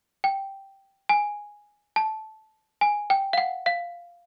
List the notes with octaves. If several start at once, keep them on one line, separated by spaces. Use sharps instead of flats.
G5
G#5
A5
G#5
G5
F5
F#5
F5